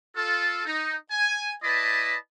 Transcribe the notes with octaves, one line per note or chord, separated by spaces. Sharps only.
F4 A4
D#4
G#5
E4 B4 D5 D#5 A5 B5